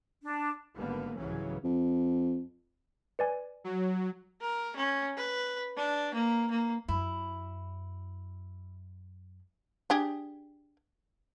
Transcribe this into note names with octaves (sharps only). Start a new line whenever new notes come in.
D4
G#1 D3 G3 A#3 B3
C2 G#2 C#3 E3 F#3 C#4
F2
B4 D5 G#5
F#3
A#4
C#4
B4
D4
A#3
A#3
F#2 E4
D4 G4 G#4